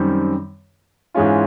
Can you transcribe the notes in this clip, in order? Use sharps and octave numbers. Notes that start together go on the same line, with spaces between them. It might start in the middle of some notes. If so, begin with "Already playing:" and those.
Already playing: F#2 D#3 G3 C4
G#2 E3 G#3 C#4 F4